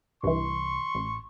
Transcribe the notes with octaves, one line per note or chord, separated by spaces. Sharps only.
C2 G2 E3 C6 C#6
A1